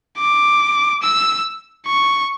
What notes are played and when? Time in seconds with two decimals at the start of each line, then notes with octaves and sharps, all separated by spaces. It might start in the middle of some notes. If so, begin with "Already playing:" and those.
0.18 D6
1.03 E6
1.86 C#6